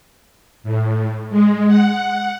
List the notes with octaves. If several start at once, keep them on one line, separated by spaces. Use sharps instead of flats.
A2
G#3
F#5